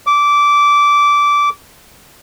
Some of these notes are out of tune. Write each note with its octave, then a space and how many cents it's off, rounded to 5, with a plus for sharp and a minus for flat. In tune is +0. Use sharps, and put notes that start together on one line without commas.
D6 -15